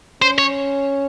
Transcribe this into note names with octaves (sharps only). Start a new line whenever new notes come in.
C#4 C5
C#5